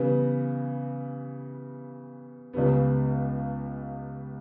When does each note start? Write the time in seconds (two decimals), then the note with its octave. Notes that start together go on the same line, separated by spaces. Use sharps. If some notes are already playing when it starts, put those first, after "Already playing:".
Already playing: C#3 E3 G3 B3
2.54 C#2 C#3 G3 B3